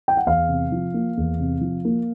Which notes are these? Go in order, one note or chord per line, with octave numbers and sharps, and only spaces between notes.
G5
F#5
E2 F5
C3
F3
A#3
E2
C3
F3
A#3